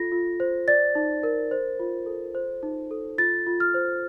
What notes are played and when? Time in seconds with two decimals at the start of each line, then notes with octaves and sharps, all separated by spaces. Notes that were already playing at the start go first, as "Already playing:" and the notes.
Already playing: F4 A4 A#6
0.12 F4
0.40 C5
0.68 D5 A6
0.95 D#4
1.23 A#4
1.51 C5
1.79 F4
2.06 A4
2.35 C5
2.63 D#4
2.91 A4
3.18 F4 A6
3.46 F4
3.60 F6
3.74 C5